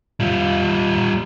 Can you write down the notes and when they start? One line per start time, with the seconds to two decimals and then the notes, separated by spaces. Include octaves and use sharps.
0.20 G3 F4